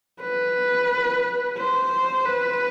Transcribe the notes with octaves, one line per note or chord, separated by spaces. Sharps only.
B4
C5
B4